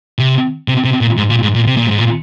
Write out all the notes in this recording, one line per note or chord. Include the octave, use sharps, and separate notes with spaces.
C3
C3
C3
A#2
G#2
A#2
G#2
A#2
C3
A#2
G#2
A#2